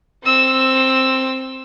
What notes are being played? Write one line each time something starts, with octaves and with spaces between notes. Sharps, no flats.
C4 E6